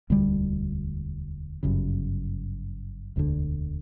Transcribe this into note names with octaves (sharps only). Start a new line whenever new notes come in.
E1 D2 D3 G3
G1 F#2 C#3
E1 D2 D3